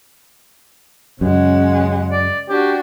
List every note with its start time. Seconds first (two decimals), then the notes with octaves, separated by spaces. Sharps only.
1.21 F#2 C#3 G#3 F#5
2.11 D5
2.49 D4 F#4 G4